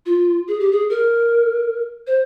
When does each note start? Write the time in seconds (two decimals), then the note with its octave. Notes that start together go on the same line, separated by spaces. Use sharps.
0.06 F4
0.48 G#4
0.60 G4
0.71 G#4
0.90 A#4
2.07 C5